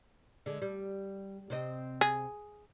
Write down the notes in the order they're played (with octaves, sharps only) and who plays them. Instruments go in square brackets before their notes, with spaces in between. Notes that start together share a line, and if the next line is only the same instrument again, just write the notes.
[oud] D3 G#3
G3
C3 C4 D#5
[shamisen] G#4